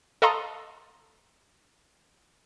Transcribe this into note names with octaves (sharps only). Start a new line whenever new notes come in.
A4 D#5 F5 A#5 C6